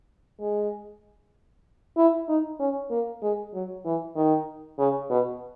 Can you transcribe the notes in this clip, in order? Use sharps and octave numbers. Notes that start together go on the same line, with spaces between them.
G#3
E4
D#4
C#4
A#3
G#3
F#3
E3
D#3
C#3
B2